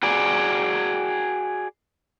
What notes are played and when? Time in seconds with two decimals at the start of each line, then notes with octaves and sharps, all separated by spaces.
0.03 F#4 G#4 D5